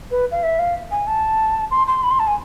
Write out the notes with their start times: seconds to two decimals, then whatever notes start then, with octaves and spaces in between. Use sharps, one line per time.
0.11 B4
0.31 F5
0.43 E5
0.59 F5
0.91 G#5
1.07 A5
1.71 C6
1.87 C6
2.03 B5
2.11 C6
2.19 A5
2.27 G#5